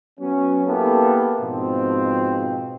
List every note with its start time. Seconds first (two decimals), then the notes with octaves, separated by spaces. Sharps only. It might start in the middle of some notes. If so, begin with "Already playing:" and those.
0.19 F#3 B3 C#4
0.67 A#3 B3 E4 G4 A4
1.40 G#2 B2 F3 C4